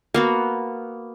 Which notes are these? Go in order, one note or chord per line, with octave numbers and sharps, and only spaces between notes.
A#3 B3 F#4